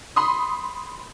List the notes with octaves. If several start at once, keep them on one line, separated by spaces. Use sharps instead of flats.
B5 C6 D#6